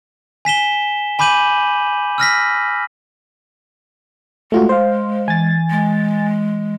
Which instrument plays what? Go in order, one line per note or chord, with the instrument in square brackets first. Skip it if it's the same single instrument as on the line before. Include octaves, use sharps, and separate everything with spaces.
[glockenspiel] G#5 B6 E7 G7
G#5 B5 D6 G6 D#7 F#7
E6 F6 A#6 B6
[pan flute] G#3 [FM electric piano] A3 F4 F#4
[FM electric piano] C5 F5
[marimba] E3 [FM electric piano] G#5 A6
[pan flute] G#3